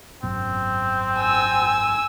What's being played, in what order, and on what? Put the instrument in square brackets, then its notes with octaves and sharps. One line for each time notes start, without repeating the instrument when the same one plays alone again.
[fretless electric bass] G#1 F#2 B2 [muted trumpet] C4
[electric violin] G#5 E6